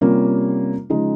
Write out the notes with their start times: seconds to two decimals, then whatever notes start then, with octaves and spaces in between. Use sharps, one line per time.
0.01 C3 G3 A#3 C#4 F4
0.90 C#3 F3 G#3 D#4